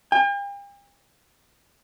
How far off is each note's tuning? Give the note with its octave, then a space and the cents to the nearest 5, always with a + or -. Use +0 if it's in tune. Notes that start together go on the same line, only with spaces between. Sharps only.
G5 +45